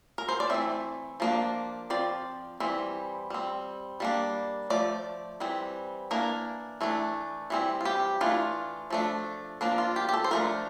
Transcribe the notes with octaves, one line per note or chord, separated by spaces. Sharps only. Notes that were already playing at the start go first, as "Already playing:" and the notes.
A#4
C5
D5
E3 A3 C4 E5
F3 A#3 D4
F3 C4 D5
E3 G3 C4
G3 C4
G3 A#3 D4
F3 A3 D5
E3 G3 C4
E3 A#3 D4 A#4
E3 A3 D4
E3 G3 C4
F4
G4
E3 A3 D4 F4
F3 A3 D4
F3 A#3 D4
F4
G4
G4
A4
C5
F3 A3 D4 A#4